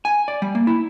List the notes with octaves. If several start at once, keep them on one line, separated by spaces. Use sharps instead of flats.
G#5
D5
G3
A#3
E4